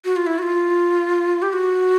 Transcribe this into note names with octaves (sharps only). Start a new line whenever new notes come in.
F#4
F4
E4
F#4
F4
G4
F#4